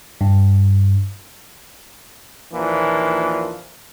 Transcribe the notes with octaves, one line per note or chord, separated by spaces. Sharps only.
G2
D#2 A#2 E3 F3 A#3 D4